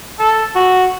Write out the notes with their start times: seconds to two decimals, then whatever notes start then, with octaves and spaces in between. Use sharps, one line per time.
0.20 A4
0.55 F#4